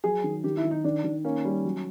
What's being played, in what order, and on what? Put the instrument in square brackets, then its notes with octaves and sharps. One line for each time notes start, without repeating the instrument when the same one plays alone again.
[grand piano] F#3 [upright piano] G#4
[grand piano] D#3
[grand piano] D#3 [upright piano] G4
[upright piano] E4
[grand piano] D#3
[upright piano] D#4
[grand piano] D#3 [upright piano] D4
[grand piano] D#3
[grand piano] A#3 [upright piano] C#4
[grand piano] G3
F#3